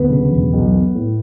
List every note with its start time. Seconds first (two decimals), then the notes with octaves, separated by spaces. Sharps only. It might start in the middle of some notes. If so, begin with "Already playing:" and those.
Already playing: D2 B3 B4
0.10 C#3
0.32 E1
0.53 B1
0.74 B3
0.95 A2